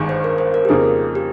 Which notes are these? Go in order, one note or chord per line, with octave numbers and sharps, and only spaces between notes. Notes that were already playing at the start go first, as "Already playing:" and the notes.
Already playing: G1 G2 D#3 G#3
C5
A#4
C5
A#4
G4
F2 C#3 F3 A#3 D#4 G#4
G4